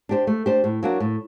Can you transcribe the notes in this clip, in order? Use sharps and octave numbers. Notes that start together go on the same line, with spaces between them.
D4 G4 C5
A3
D4 G4 C5
A2
F#3 A#3 D4 F#4
A2